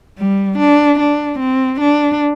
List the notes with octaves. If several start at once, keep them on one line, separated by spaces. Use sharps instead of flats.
G3
D4
D4
C4
D4